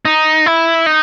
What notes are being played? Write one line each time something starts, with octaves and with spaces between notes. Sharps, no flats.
D#4
E4
D#4